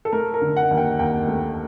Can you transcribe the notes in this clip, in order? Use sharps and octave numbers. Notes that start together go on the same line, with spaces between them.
A4
A3 A#4
A#4
D3
F#5
D#2
G5
D#2 G5
A3